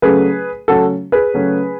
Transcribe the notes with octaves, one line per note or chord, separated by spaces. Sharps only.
C#3 F#3 A3 C#4 G#4 B4
C#3 F#3 A3 C#4 F#4 A4
G#4 B4
C#3 F#3 A3 C#4